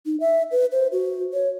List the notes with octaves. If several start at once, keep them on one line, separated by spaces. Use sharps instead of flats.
D#4
E5
B4
C5
F#4
C#5